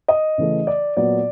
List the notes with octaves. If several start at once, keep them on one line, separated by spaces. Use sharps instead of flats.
D#5
C#3 E3 A3
D5
A#2 F#3 B3 D5